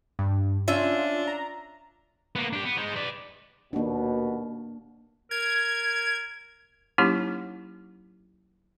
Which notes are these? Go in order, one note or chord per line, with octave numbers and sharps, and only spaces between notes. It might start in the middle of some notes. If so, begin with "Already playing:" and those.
G2
C#4 D4 F4 E5
A#5
A#3 B3
D4 G4
B3
G#3 D#4
B4 D5
D#2 B2 A#3 D4
A#4 G#6
F#3 A#3 C#4 D#4 E4 G4